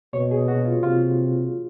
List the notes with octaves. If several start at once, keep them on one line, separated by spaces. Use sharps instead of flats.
B2 C#5
G#4
F#4
F4
C3 F4